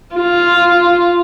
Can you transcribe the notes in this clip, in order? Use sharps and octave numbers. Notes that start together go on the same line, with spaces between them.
F4